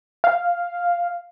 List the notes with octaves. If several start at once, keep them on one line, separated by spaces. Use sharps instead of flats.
F5